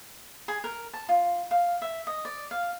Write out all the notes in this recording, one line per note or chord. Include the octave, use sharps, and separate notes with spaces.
G#4
A#4
A5
F4
F5
E5
D#5
D5
F5